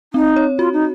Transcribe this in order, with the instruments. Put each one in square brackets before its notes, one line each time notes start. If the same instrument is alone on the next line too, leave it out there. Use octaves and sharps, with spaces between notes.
[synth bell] C4 [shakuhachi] D#4
[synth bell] C#5
[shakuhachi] F4 [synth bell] F#4
[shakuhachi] D#4